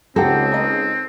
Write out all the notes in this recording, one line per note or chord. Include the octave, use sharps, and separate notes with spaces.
C#2 C4 D#4 G4 A4 F#5
D#4 D#5